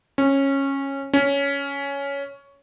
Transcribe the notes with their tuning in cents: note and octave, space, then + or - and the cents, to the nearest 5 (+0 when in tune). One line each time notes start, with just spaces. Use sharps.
C#4 -15
C#4 +10